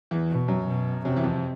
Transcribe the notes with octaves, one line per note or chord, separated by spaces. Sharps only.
E2 E3
B2
F#2 F#3
B2
F#2 C3 F#3
E3
F2 F3